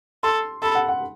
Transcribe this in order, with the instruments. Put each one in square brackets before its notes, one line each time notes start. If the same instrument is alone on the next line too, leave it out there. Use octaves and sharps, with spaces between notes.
[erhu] A4 [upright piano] C6
[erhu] A4 [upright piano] B5
[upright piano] F#5
F#5